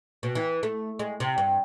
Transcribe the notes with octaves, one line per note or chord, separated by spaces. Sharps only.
B2
E3
A3
G#3
C3
G2